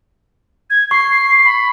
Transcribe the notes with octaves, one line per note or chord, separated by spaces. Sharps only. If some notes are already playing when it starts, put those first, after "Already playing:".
G#6
C#6 C7
B5